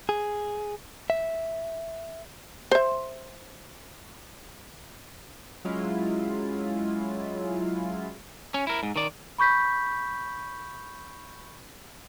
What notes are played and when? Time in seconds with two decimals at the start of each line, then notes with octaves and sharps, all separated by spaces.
0.09 G#4
1.10 E5
2.72 C5 E5
5.65 F#3 G#3 C#4 E4 F4
8.54 C#4
8.67 E4 A#4
8.83 G#2
8.96 D#3 D5
9.38 B5 C#6 G6 B6